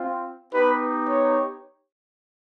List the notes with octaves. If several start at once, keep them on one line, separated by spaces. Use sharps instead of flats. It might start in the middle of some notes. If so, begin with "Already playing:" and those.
Already playing: C4 F4
B3 D#4 G4 B4
C#5